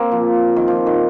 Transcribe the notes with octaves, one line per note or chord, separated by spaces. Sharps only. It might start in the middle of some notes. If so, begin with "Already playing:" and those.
Already playing: A#3 C4
F3
D#3
F3
D#3